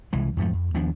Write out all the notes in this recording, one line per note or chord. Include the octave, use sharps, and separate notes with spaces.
C2 E3 G#3
F2 G#2 F3 A3
F2
D#2 F3 B3 D4